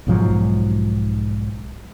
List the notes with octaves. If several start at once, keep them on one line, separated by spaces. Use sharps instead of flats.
B1 G#2 F3 F#3